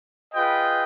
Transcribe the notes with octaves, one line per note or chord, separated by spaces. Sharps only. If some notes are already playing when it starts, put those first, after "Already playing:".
F4 G#4 B4 D#5 G5